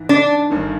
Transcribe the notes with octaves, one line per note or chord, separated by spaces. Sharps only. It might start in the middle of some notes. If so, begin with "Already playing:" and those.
Already playing: G#2 E3
D4
G1 G2 D#3